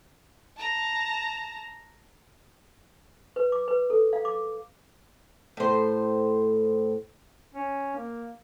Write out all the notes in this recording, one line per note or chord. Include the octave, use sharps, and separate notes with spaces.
A5 A#5
B4
D6
B4
A4
F5
D6
A2 C5
C#4
A#3